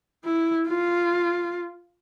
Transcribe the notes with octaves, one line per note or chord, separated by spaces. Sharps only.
E4
F4